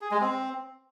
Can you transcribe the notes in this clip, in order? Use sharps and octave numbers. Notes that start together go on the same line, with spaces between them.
G#4
G#3
C4